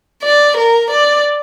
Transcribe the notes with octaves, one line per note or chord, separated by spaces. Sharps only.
D5
A#4
D5